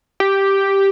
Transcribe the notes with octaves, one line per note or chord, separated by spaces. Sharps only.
G4